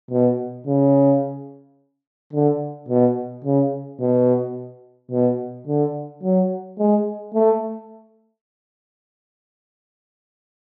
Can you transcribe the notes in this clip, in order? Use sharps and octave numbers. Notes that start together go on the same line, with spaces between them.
B2
C#3
D3
B2
C#3
B2
B2
D3
F#3
G#3
A3